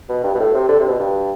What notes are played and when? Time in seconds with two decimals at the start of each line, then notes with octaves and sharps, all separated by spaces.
0.09 B2
0.24 G2
0.34 B2
0.40 A2
0.54 C3
0.68 D3
0.79 C3
0.88 B2
0.99 G2